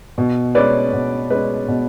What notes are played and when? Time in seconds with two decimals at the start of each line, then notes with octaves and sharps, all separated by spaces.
0.18 B2
0.55 G#3 C#4 B4 D5
0.93 B2
1.30 G#3 C#4 B4
1.68 B2